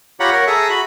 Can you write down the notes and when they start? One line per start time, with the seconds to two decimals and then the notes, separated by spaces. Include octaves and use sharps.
0.20 F4 G4 C#5 F#5 A#5 B5
0.32 A#4 C#5 F#5
0.47 G#4 A4 E5 A#5
0.70 F#4 B5